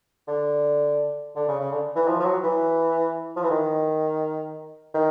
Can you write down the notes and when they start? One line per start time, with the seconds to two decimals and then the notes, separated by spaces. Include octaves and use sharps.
0.28 D3
1.36 D3
1.48 C#3
1.59 C#3
1.72 D3
1.96 E3
2.07 F3
2.20 F3
2.25 F#3
2.44 E3
3.36 F3
3.43 E3
3.51 D#3
4.94 D#3